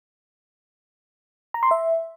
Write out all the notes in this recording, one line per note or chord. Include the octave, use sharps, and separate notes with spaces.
A#5
C6
E5